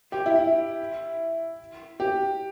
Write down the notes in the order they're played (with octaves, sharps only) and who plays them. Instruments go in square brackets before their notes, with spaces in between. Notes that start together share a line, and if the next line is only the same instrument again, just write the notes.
[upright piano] G4
E4
E4
G4